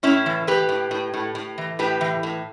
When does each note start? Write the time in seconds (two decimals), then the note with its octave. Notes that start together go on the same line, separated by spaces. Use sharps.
0.03 A2 C#4 E4
0.26 E3
0.47 A2 G4 B4
0.69 A2
0.91 A2
1.14 A2
1.35 A2
1.58 E3
1.79 A2 G4 B4
2.01 E3
2.23 A2